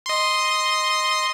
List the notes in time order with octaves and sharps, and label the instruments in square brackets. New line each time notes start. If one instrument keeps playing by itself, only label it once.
[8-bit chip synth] D#5 C6